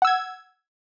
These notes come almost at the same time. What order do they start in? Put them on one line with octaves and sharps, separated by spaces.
F#5 E6 G#6